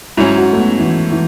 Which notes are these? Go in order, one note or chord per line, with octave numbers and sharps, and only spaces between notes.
G#2 F#3 C#4 E4
F#4
A3
B3
E3
E3